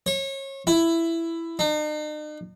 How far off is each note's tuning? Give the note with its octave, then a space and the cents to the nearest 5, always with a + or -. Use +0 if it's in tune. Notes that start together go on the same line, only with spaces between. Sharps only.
C#5 -30
E4 +10
D#4 -45